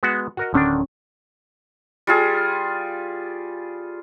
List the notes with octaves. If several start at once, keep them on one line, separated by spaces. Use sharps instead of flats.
G#3 B3 F#4
F#4 A#4 D#5
D1 D3 D#3 C#4 D4
G3 F4 G#4